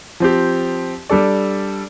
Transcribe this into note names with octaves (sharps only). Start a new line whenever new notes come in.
F3 C4 G4
G3 D4 A4 D5